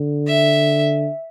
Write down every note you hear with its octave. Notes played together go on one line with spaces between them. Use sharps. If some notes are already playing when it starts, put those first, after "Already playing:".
Already playing: D3
E5